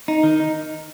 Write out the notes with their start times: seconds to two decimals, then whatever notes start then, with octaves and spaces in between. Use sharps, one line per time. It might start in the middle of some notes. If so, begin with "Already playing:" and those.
0.08 D#4
0.23 D#3
0.40 D#4